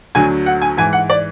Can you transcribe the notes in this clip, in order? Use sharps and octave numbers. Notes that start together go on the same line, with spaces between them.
D2 D3 F#3 G#5
F#5
G#5
G#2 E3 G#5
F#5
D5